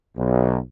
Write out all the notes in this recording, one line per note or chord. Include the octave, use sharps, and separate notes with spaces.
B1